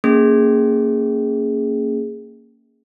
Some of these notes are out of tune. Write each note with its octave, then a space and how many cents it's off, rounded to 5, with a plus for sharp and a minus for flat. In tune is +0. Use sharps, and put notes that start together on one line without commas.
A#3 -15 C#4 +5 G#4 +0